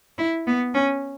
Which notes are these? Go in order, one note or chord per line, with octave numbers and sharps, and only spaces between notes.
E4
B3
C#4